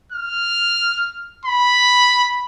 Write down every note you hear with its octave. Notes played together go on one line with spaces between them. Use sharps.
F6
B5